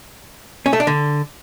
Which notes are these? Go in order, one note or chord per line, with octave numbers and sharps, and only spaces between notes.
C#4
A3
D4
D3